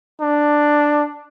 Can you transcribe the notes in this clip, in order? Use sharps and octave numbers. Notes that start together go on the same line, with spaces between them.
D4